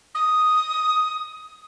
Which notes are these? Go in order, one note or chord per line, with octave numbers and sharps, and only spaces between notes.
D#6